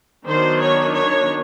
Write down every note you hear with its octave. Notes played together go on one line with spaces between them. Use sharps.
D#3 F#3 B3 D4 C5
C#5
C#5